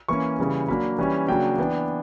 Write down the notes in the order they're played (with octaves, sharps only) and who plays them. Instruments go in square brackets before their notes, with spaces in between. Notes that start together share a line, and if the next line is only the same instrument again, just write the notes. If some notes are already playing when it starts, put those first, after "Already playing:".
[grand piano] E3 A#3 C#4 C#6
C#3 E3 G3
F#3 A#3 D4 B5
E3 G3 C#4
C#3 F#3 A#3 D4 G5
E3 B3 D4